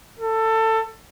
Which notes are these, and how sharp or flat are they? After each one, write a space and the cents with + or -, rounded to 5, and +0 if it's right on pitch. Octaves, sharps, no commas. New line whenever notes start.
A4 +20